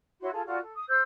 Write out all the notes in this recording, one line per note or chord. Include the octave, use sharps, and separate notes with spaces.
E4 F#4 C#5 C6
F4 G#4 A4 A5
F4 F#4 A4 D5
A4
D#6
C5 E6 G6